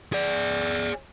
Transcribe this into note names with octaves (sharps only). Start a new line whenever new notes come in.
G#4 D5